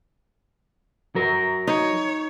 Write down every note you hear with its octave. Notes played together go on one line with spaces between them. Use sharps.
F#3 A#4
D#4 C#5